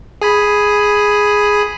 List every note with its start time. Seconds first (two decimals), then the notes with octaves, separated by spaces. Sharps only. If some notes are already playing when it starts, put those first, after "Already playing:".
0.22 G#4 G#5 B5